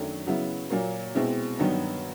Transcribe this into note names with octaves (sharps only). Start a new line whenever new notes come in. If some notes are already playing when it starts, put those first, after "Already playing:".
Already playing: F#2 D#3 F#3 A3 D4
C#3 F#3 B3 E4
A#2 F#3 A#3
B2 G#3 C4 E4
G2 D#3 F#3 B3 D#4